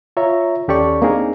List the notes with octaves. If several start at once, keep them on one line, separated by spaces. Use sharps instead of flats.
F4 C#5 E5 A#5
D#2 C#4 G4 A4 D5 C#6
A#3 C4 D4 D#4 G#4 A#4